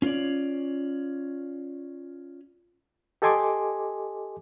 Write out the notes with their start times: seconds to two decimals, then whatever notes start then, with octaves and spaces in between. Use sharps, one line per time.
0.02 C#4 F4 B4 C#5 D5
3.22 G4 A4 D#5 G#5 C6 D6